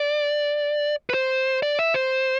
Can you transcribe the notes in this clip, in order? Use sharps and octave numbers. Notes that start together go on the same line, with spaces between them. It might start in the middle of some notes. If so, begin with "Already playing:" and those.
Already playing: D5
B4
C5
D5
E5
C5